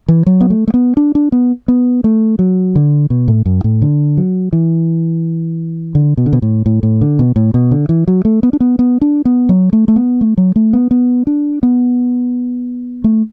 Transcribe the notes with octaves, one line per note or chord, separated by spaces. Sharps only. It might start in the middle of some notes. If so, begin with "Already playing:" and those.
E3
F#3
B3
A3
A3
B3
D4
D4
B3
B3
A3
F#3
D3
B2
A2
F#2
A2
D3
F#3
E3
D3
B2
D3
B2
A2
A2
A2
D3
B2
A2
B2
D3
E3
F#3
A3
B3
D4
B3
B3
D4
B3
F#3
A3
A3
B3
A3
F#3
A3
B3
B3
D4
B3
A3